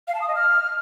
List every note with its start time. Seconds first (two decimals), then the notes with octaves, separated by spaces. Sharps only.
0.08 F5
0.15 A5
0.21 D#6
0.28 D#5
0.35 F6